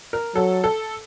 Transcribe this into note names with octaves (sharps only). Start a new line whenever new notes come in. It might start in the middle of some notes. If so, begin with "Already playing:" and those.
A#4
F#3 A4
A4